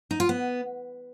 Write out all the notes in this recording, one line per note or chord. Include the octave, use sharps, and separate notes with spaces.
D#4
F4
B3